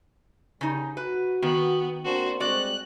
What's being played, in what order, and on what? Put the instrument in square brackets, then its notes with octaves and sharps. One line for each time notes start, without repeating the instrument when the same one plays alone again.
[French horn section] E2 G3 A#4 [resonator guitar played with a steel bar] C#3 D#4
[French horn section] F#4 [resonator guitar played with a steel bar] B4
[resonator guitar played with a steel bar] D#3 [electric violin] B3
[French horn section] A#3 C4 D4 [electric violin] F#4 C5
[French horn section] G3 G#3 C4 [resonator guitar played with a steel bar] F#4 D5 [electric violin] F#6